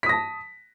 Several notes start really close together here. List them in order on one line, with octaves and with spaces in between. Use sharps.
B6 D#6 A#6 A5